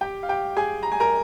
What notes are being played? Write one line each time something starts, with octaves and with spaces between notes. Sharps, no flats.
G4 G5
F5
G4 G5
G#4 G#5
A#5
G#5
A#4 A#5